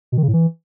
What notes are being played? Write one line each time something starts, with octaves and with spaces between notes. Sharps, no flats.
B2
D#3
C#3
A2
E3